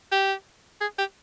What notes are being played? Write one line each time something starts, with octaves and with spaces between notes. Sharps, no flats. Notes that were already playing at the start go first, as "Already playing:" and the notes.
G4
G#4
G4